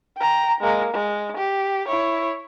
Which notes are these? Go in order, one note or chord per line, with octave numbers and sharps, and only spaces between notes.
G5 A#5
G#3 A#3
G#3
G4
E4 C#5